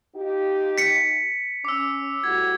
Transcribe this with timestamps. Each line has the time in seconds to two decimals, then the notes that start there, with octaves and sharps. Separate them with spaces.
0.16 D#4 F4 G4
0.78 B6 C#7
1.65 C#4 D6 E6
2.24 A2 G3 F#4 G#6